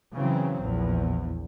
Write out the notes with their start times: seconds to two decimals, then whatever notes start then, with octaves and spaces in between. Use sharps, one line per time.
0.15 C#3 E3 F#3 C4
0.61 A#1 E2